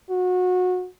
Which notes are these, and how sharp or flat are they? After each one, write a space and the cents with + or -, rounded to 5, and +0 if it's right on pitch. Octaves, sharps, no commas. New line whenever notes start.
F#4 -25